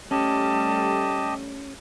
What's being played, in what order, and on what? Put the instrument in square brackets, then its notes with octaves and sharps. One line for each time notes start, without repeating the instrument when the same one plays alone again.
[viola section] G3 A3 [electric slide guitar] C#4 [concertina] G4 D#5 [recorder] A5